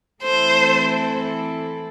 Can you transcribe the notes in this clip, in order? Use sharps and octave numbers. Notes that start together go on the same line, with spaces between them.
E3 A3 C4 E4 A4 C5